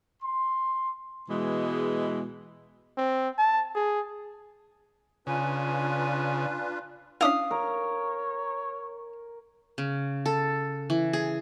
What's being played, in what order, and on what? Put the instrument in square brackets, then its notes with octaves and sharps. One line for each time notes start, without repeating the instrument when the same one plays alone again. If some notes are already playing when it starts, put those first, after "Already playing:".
[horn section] C6
[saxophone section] B2 E3 G#3
[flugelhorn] C4
A5
G#4
[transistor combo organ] C#3 [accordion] D4 F4 B4 [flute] G#5
[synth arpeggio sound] C#4 D4 E4 [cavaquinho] F5 D#6
[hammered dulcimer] A#4 [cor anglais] C#5
[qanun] C#3
A4
E3
G#4